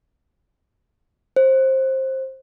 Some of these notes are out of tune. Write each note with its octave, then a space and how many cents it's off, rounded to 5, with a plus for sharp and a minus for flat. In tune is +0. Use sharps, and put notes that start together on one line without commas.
C5 +20